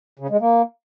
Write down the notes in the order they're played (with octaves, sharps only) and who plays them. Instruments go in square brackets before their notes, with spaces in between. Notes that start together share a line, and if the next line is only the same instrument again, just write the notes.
[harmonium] C#3
G#3
A#3